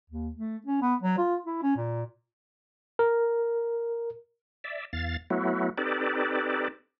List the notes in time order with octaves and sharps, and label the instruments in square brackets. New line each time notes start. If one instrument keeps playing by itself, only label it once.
[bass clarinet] D#2
A3
C#4
B3
F#3
F4
E4
C#4
A#2
[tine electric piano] A#4
[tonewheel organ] D5 E5
E2 F5 A6
F#3 A3 B3 E4 F#4
C4 D#4 G4 A4 B4 D5